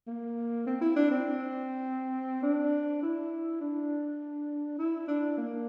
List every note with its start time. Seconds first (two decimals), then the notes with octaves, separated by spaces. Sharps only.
0.07 A#3
0.66 C4
0.81 E4
0.96 D4
1.11 C4
2.43 D4
3.02 E4
3.61 D4
4.78 E4
5.08 D4
5.37 A#3